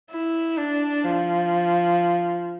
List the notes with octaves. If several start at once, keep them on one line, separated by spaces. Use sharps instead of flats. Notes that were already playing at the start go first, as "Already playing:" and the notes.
E4
D4
F3